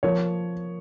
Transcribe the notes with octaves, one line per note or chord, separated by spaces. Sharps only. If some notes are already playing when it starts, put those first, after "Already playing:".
F3 A#4 C#5